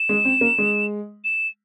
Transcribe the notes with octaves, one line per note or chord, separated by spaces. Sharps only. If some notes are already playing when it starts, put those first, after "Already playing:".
Already playing: E7
G#3
C4
A#3
G#3
E7